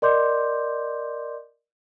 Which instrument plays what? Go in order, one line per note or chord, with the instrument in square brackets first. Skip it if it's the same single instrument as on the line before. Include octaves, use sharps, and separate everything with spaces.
[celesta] A#4 D5 D#5 C6 D6 G6